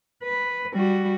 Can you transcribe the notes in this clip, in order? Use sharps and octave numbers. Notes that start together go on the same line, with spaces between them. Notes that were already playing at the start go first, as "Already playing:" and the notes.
B4
G3 F#4